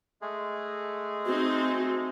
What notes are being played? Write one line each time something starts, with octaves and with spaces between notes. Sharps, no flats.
G#3 A3 G#4
C4 D#4 F#4